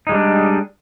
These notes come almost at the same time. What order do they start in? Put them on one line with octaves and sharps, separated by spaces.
D#4 G#3 G3 D4